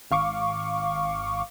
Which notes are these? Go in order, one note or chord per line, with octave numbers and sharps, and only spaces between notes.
G#1 F5 C#6 D6